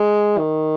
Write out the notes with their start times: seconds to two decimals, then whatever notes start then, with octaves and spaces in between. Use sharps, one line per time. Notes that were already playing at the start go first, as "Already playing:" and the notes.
Already playing: G#3
0.38 D#3